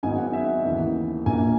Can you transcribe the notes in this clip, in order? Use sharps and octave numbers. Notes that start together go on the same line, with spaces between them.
G#1 G#2 F#3 B3 G#5
F#5
E5
D#2 C#3 E3 B3
A#1 A#2 A#3 G#5